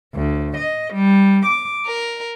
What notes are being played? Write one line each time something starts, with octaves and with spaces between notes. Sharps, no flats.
D2
D#5
G3
D6
A#4